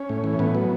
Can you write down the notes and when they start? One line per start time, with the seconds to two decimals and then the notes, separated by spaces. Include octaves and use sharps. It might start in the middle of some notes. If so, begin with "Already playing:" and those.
Already playing: C#4
0.09 A2
0.24 E3
0.39 A2 B3
0.55 F#3